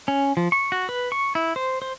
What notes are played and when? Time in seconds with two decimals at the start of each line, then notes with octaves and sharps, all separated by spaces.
0.08 C#4
0.37 F3
0.52 C#6
0.72 F#4
0.89 B4
1.12 C#6
1.35 E4
1.56 C5
1.82 C5